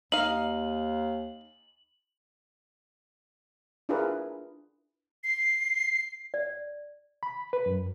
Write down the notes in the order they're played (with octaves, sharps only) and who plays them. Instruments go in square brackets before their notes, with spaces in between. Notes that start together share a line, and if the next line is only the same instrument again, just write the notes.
[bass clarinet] D#2 [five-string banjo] D#4 F5 [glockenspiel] F#7
[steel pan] D4 E4 F4 G#4 A#4 B4
[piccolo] C7
[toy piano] D5
[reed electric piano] B5
B4
F#2